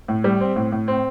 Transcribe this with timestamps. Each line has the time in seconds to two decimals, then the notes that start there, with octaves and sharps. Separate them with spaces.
0.08 A2
0.24 G3
0.41 C4
0.56 A2
0.72 A2
0.88 C4